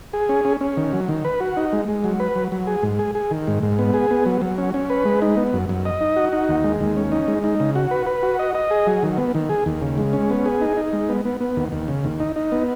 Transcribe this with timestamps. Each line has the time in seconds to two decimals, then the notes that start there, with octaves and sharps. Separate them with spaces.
0.13 G#4
0.29 C#4
0.45 C#4
0.61 C#4
0.77 D#3
0.93 F#3
1.09 D#3
1.25 B4
1.40 F#4
1.57 D#4
1.73 G#3
1.88 G#3
2.04 F#3
2.20 B4
2.35 F#3
2.52 F#3
2.67 G#4
2.83 G#2
2.99 G#4
3.15 G#4
3.31 D#3
3.47 G#2
3.63 G#2
3.79 B3
3.94 G#4
4.11 B3
4.26 F#3
4.42 F#3
4.58 C#4
4.74 C#4
4.90 B4
5.05 G#3
5.22 D#4
5.37 B3
5.53 F#2
5.69 F#2
5.85 D#5
6.01 D#4
6.16 F#4
6.33 D#4
6.49 D#2
6.64 G#3
6.81 D#2
6.97 C#4
7.12 D#4
7.28 G#3
7.44 D#4
7.60 C#3
7.75 F#4
7.91 B4
8.07 B4
8.23 F#4
8.39 D#5
8.55 D#5
8.71 G#4
8.87 F#3
9.03 D#3
9.18 B3
9.35 D#3
9.49 G#4
9.66 D#2
9.82 C#3
9.98 G#3
10.13 C#4
10.30 B3
10.46 G#4
10.61 D#4
10.77 D#4
10.93 G#3
11.09 B3
11.25 B3
11.40 B3
11.56 D#2
11.72 D#2
11.88 C#3
12.04 D#2
12.20 D#4
12.36 D#4
12.52 B3